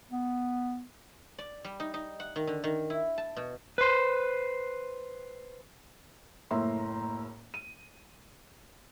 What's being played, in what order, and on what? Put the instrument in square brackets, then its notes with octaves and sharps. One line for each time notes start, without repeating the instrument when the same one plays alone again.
[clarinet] B3
[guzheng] D5
G3
D#4
D#4
F#5
D#3
D3
D#3
E4
A5
B2
[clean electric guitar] B4 C5
[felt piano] F#1 A2 A#3 E5 A#5 C6
D#7